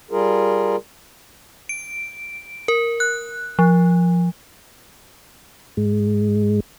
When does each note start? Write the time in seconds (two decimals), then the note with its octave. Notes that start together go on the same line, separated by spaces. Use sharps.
0.11 G3 F4 G#4 A#4
1.69 D7
2.68 A#4
3.00 F#6
3.59 F3
5.77 G#2 G#3